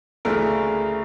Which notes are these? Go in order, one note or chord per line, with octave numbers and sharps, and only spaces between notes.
D2 C#3 E3 A3 A#4